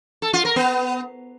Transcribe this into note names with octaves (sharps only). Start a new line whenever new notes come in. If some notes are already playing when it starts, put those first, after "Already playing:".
A4
F4
A#4
B3